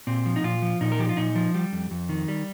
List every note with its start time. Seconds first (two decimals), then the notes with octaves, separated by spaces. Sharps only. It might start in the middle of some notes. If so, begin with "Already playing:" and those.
0.07 A#2 C4
0.26 F3
0.36 D#4
0.43 A#2 F4
0.62 F3
0.81 A#2 D#4
0.92 A#4
0.99 F3 G4
1.09 F4
1.17 A#2 D#4
1.35 F3
1.54 G3
1.72 F2
1.91 F2
2.09 D#3
2.28 G3